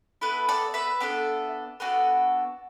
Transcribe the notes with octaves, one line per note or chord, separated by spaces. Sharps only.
B3 E4 A4 B4
A4 D5
B4 E5
B3 D4 A4
B3 D4 F#4 A4